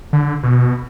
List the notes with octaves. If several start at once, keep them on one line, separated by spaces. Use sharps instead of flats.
D3
B2